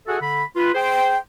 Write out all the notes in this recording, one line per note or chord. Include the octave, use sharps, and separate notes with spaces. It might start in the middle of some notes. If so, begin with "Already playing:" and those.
F#4 G#4 A4 E5 F#5 G#5
D3 B5
F4 B4
G#4 C5 G5